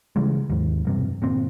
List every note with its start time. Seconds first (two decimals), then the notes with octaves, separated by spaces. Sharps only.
0.16 C#3 E3 G3 G#3
0.50 D#2 G#2
0.85 E1 G2 C3
1.22 G1 A#2 C4